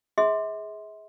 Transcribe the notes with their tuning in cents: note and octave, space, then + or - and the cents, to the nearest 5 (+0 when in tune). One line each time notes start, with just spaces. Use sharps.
G#4 +0 E5 -40 C6 +0